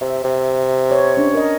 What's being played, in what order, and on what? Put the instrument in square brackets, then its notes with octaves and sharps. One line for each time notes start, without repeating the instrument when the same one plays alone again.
[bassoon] C3 [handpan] E5
[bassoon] C3
[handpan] B4 C#5
C#4 D4
A#4 D#5